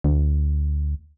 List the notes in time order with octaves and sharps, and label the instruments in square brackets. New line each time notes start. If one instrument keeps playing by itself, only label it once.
[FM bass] D2